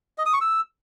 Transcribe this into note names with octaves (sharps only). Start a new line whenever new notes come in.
D#5
D#6
C#6
E6